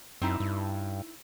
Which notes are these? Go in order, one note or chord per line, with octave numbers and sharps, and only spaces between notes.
F#2 C4 D#4 E4
G2